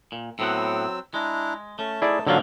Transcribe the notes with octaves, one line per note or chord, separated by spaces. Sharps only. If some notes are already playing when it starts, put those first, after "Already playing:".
A#2
A2 F#3 B3 C4 F#5 E6
G#3 D4 E4 A#5
A3 C#4 A5
D#4 E4 G#4 D5 A5
G#2 D3 F#3 A#3 C#4 F4 A4